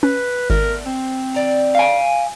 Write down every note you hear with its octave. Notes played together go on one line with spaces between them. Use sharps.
C#4 B4
G#1 D3 A3 B3 A#4
C4 C5
D#3 D5 A#5
F5 G#5